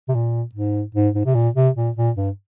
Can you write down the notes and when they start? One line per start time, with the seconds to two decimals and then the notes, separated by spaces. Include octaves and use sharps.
0.08 C3
0.15 A#2
0.55 G#2
0.95 G#2
1.15 G#2
1.26 C3
1.35 A#2
1.55 C3
1.76 A#2
1.96 A#2
2.16 G2